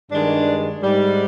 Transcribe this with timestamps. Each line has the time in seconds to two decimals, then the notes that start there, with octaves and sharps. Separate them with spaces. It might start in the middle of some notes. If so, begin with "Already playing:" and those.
0.11 G2 D#3 G#3 D4
0.82 G#2 G3